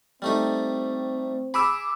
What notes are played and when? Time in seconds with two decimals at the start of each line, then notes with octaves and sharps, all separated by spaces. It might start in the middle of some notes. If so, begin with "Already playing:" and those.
0.22 G3 A3 C4 D#4
1.54 G#4 B5 D6 E6